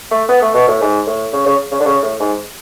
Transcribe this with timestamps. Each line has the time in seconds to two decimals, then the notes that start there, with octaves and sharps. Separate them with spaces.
0.11 A3
0.29 B3
0.42 A3
0.54 B2
0.68 A2
0.81 G#2
1.07 A2
1.33 C#3
1.46 C#3
1.72 C#3
1.80 D3
1.86 C#3
2.03 A2
2.20 G#2